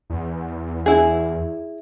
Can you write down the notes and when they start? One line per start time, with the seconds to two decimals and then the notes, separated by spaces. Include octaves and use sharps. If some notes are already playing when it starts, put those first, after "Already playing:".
0.10 E2
0.86 E4 G#4